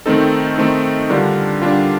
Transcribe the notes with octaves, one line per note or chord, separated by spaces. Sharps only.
D#3 A3 C4 D#4 A4
D#3 A3 C4 D#4
D3 G3 D4 F4 A#4
D3 G3 D4 F4